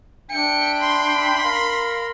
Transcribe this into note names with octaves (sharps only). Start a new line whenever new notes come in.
D4 E5 G5 C#7
B5 C6
A#4 F5